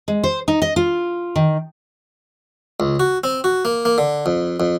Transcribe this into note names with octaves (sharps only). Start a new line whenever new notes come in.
G#3
C5
D#4
D#5
F4
D#3
C#2
F#4
C4
F#4
A#3
A#3
D3
F2
F2